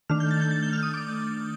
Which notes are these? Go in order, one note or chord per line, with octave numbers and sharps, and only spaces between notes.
D#3 A3 D4 F6
G6
A6
G6
A6
G6
F6
D#6
D6